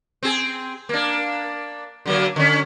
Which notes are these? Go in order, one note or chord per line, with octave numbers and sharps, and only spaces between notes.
C4 G#4
A#3 D4
D3 F#3 A#3
D3 C#4